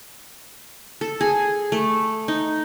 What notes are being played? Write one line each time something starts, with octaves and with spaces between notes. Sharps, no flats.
A4
G#4
A3
D#4